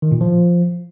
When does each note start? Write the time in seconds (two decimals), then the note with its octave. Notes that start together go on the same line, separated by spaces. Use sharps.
0.02 D#3
0.12 A#2
0.21 F3